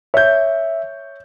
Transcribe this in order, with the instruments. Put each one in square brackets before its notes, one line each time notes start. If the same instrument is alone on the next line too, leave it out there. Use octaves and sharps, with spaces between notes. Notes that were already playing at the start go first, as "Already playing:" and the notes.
[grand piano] C#5 G6 [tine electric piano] E5